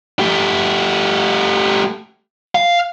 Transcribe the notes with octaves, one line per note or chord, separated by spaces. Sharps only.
A3 G4
F5